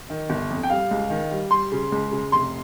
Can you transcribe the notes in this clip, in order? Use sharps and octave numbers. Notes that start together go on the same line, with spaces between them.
D#3
G1
F2
G5
G3 F5
C#2
D#3
G3
G3 C6
C#3
C#2
C#3
F1 C6